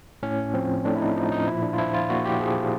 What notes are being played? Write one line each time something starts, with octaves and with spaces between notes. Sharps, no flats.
A2 C#4
F3 C4
A2 D4
E4
D#4
F3 D#4
D#4
A#2 E4
D4
F4
F3 E4
F4
A#2 F#4
G4
F3 G#4